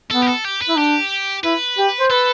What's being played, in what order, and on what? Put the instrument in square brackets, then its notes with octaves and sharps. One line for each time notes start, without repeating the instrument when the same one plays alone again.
[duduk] B3 [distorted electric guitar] A4
[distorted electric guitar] G4
A4
G4
B4
[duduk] E4
[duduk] D4 [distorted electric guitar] G4
[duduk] E4 [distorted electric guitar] B4
[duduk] G4
C5
[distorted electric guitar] A4 [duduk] B4